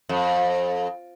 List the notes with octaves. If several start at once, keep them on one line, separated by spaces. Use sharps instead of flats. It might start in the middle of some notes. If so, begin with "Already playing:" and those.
F2